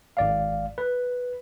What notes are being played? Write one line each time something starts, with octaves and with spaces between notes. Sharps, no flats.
G#1 D5 F5
B4